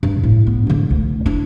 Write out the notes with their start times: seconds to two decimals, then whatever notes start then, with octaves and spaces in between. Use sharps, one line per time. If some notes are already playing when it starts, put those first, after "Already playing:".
0.03 G2
0.23 A2
0.47 B3
0.67 G#2 D3
0.90 D2
1.26 D4 E4